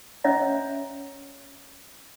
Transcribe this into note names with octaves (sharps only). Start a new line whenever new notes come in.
C#4 C#5 D#5 E5 A#5